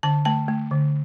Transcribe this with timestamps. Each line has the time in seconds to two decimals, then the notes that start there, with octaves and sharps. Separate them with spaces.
0.03 D3 A5
0.25 A3 A5
0.48 A3
0.71 D3